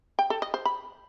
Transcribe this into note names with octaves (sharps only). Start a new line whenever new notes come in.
G5
A4
D#5
C5
B5